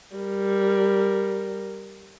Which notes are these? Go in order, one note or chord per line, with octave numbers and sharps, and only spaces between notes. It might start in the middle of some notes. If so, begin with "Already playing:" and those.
G3 A#4